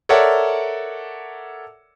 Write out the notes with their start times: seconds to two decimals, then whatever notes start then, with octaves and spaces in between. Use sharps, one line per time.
0.09 A4 A#4 C#5 D5 E5 F#5